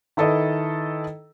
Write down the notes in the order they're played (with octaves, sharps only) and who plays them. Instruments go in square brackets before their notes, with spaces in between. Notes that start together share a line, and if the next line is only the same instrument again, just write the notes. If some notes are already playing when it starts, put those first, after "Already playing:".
[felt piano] D#3 E4 A4 B4 D#5